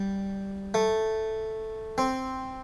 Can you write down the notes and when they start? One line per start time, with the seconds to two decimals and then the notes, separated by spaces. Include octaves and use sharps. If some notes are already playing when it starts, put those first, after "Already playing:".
Already playing: G3
0.74 A3
1.98 C4